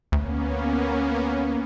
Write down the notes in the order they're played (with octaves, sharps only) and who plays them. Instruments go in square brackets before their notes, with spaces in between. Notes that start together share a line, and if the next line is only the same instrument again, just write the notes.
[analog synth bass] D2 [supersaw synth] A#3 B3 C#4